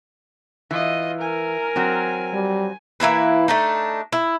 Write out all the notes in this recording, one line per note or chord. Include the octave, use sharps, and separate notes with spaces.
E3 F4 D#5
A#4 G#5
F#3 C4
G3
E3 A#3 E4 B4
A3 D4 D#4
E4